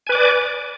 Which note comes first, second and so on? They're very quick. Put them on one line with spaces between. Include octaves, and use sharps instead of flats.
G#5 B4 D6 D5